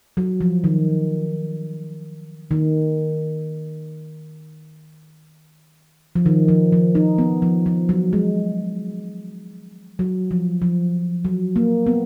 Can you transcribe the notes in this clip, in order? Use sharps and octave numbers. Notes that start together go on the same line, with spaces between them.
F#3
F3
D#3
D#3
F3
D#3
F3
F3
D#4
B3
F3
F3
F#3
G#3
F#3
F3
F3
F#3
A#3
B3